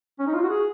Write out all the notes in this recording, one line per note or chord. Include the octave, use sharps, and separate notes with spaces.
C#4
D#4
F4
F#4
G#4